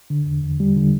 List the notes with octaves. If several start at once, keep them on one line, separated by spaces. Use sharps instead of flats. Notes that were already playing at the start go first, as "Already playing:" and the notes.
D3
E2
E2
G3
D3